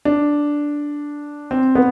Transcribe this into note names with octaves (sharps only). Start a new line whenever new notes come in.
D4
C4
B3